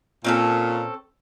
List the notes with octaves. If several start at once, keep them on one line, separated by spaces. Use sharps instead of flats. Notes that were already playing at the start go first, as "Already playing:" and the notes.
A#2 C4 C#4 A4